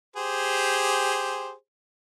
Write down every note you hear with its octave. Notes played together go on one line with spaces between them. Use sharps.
G4 G#4 C5